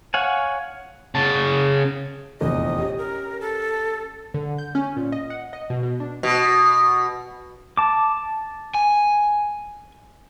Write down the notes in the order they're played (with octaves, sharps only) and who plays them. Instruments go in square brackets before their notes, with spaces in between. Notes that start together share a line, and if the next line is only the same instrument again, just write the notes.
[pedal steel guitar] C#5 F5 F#5 G#5
[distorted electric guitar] C#3 A5
[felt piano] F1 A#1 E2 [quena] D#5
[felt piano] C#4 G4
[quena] A#4
A4
[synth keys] D3
G6
C#4
A#2
D#5
F#5
D#5
B2
B2
D4
[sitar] B2
[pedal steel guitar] A5 D6
[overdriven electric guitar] G#5